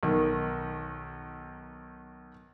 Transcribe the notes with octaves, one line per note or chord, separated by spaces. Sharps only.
B1 D#3